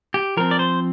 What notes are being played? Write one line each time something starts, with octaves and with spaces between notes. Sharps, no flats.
G4
F3 C4 A#4
D5
C5